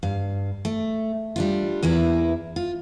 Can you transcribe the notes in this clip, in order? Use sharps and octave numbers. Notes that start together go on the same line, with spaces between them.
G2 F5
A3
G3 D4 F4
E2 A#3 E4 B4
F4